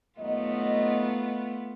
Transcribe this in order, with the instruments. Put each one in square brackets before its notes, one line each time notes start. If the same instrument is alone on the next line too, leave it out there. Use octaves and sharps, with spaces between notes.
[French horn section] D#2 F#3 D#5 [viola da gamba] A3 B3 F4